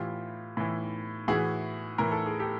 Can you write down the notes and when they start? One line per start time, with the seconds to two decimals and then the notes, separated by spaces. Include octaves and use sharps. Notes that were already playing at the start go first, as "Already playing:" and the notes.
Already playing: A2 E3 F4 G4
0.57 A2 E3
1.28 A2 E3 F#4 G#4
1.98 A2 E3 A#4
2.12 A4
2.26 G#4
2.39 G4 A4